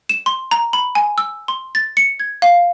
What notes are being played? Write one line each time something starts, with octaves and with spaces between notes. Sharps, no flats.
E7
C6
A#5
B5
G#5
E6
C6
A6
C#7
G#6
F5